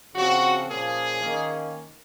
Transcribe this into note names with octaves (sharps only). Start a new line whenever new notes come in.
C#3 F3 C4 F#4
A#2 F3 A#3 C#4 G#4
D#3 A#3 C#4